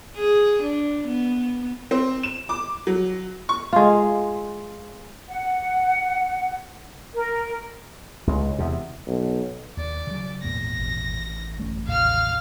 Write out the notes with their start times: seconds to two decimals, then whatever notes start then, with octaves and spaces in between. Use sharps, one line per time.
0.17 G#4
0.63 D4
1.07 B3
1.91 C4
2.23 E7
2.49 D6
2.87 F#3
3.49 C#6
3.73 G#3 F4
5.29 F#5
7.13 A#4
8.27 C#2
8.58 E2 C3
9.07 B1
9.77 D#2 D5
10.07 C#3 F#3
10.43 G#1 E2 A#2 A#6
10.78 A1
11.58 F#1 A3 C#4
11.87 D#2 A2 C3 F5 F6